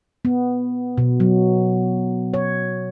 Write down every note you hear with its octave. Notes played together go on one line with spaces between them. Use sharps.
B3
B2
F#3
C#5